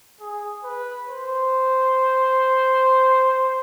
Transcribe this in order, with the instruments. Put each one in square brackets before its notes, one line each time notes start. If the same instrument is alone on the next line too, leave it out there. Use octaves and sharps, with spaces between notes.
[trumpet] G#4
B4
C5